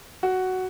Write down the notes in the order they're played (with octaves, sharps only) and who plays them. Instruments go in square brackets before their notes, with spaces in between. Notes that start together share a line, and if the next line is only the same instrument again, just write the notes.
[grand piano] F#4